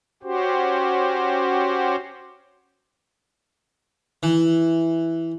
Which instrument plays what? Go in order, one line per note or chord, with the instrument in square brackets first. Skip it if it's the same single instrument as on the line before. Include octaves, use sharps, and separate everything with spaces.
[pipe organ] C#4 F#4 G4 C5
[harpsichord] E3